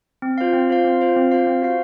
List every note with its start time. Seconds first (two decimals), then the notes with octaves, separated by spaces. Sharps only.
0.22 C4
0.38 F4 C5 F5
0.53 C4
0.70 F4 C5 F5
0.85 C4
1.01 F4 C5 F5
1.16 C4
1.31 F4 C5 F5
1.47 C4
1.62 F#4 C5 F5